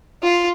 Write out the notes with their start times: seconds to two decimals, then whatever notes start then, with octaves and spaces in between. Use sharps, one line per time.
0.23 F4